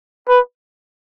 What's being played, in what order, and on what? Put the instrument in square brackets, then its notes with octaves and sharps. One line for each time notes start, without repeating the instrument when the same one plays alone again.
[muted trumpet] B4